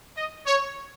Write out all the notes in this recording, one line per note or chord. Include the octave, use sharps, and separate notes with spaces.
D#5
C#5